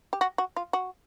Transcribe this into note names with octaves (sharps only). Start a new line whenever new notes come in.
G4
F#4
F#4
F4
F#4